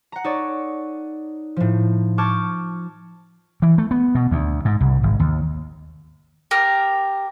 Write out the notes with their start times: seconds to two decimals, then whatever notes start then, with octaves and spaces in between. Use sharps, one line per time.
0.12 F#5 A#5
0.24 D#4 A4 C#5 D5
1.56 A2 F3
2.18 A5 C#6 D6 F6 G6 G#6
3.62 E3
3.78 A3
3.91 B3
4.15 B2
4.31 D2
4.65 G#2
4.81 C2
5.03 G#1
5.20 D#2
6.51 G4 A#4